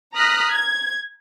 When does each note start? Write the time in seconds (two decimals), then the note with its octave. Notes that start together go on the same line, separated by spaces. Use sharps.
0.14 A#5 D#6 F6 F#6 A#6 B6
0.52 G#6